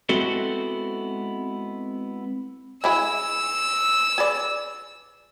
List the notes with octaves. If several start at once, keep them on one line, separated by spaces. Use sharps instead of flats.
G#3 B3 C4 E4 F#4 A4
G#3 E4 G#4 E6
G#4 B4 D5